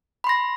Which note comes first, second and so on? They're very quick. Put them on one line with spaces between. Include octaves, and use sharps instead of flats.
B5 C6 A#6